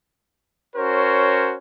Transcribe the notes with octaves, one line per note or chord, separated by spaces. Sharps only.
C#4 F#4 A#4 C5 C#5